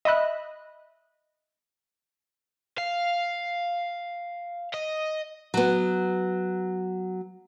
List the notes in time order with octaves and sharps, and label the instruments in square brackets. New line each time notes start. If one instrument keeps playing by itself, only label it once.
[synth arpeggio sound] D#5 E5 B5 F#6
[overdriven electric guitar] F5
D#5
[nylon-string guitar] F#3 B3